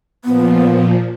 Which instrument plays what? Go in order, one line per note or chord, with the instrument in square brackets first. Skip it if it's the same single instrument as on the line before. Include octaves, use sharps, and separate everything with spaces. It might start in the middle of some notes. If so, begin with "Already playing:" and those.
[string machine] A#2 F3 [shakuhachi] B3